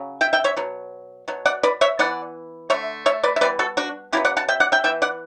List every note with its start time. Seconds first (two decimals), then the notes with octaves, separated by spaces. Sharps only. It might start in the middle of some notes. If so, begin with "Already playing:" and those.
Already playing: C#3 F#3
0.21 E5 G5
0.33 E5 G5
0.44 C#5 E5
0.57 B2 F#3
1.28 B2 F#3
1.46 D5 F#5
1.63 B4 D5
1.81 C#5 E5
1.99 E3 B3 D5 F#5
2.70 D3 A3 C#5 E5
3.06 C#5 E5
3.23 B4 D5
3.36 E5
3.41 E3 G3 B3 B4 D5
3.59 F#4 A4
3.77 D4 F#4
4.13 C#3 F#3 B3 E4 G4
4.25 D5 F#5
4.37 F#5 A5
4.48 E5 G5
4.60 D5 F#5
4.72 E5 G5
4.84 E3 B3 E5 G5
5.02 D5 F#5